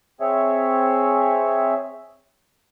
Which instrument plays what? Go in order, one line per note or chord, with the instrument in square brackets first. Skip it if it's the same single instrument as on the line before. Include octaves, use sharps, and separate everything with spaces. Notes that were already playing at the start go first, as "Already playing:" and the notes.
[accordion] C4 G#4 C#5 E5